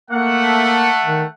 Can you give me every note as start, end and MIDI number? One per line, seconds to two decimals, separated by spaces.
0.11 1.26 57
0.11 0.91 58
0.11 1.26 78
1.05 1.24 51